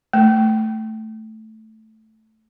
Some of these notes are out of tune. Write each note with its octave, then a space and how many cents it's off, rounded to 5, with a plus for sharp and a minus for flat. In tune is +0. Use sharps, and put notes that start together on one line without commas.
A3 +0